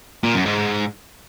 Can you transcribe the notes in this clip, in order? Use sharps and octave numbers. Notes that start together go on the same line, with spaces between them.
A#2
F#2
G#2